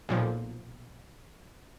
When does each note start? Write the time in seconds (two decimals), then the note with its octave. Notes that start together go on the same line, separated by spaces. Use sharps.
0.09 B1 A#2 F3